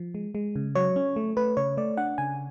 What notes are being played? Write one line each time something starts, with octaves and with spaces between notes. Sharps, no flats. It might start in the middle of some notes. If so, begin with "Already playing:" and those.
Already playing: F3
G#3
G#3
C#3
F#3 C#5
C#4
A3
A3 B4
C#3 C#5
A3 D5
D4 F#5
C#3 G#5